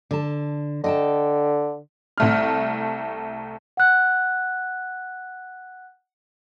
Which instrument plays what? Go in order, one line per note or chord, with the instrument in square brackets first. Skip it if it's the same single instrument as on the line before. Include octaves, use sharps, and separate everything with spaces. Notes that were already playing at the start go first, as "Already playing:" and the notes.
[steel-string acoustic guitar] D3 A5
[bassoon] D3 [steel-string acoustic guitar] D#5 G5 A5
[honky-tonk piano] C2 A3 F6
[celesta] F#5 F#6